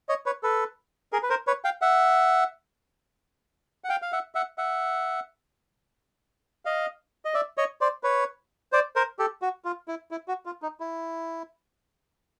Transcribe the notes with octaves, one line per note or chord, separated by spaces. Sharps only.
C#5 D#5
B4 C#5
A4 B4
G#4 A#4
B4
A#4 C5
B4 C#5
F5 G5
E5 F#5
F#5
F5 G5
F5
E5 F#5
E5 F#5
E5 F#5
D#5 F5
D#5
D5 E5
C#5 D#5
C5 D5
B4 C#5
C5 D5
A#4 C5
G4 A4
F#4
F4
E4
E4
F#4
F4
D#4
E4